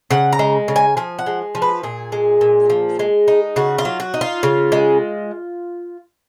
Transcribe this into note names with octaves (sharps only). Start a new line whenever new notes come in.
C#3 F#5
A#5
G#3
C#3
G#5
F3 G#5
F#5
G#3
F3
B4
A#2 G#4
G#3
A#2
F3
G#3
D#4
C#3 F#4
F4
F#3
F#4
D#4
F4
C#3
G#3